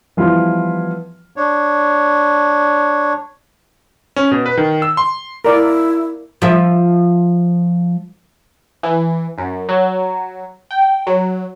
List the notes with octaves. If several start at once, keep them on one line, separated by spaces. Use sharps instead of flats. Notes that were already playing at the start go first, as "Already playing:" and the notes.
E3 F3 G3 B3 E4 F4
D4 C#5
C#4
B2
B4
D#3
E6
C6
E4 A#4 D5
F3 E5
E3
F#2
F#3
G5
F#3